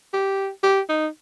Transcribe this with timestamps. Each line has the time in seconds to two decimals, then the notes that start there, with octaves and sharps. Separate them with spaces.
0.13 G4
0.63 G4
0.89 D#4